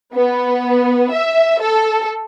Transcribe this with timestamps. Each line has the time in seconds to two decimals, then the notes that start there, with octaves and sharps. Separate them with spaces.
0.15 B3
1.13 E5
1.61 A4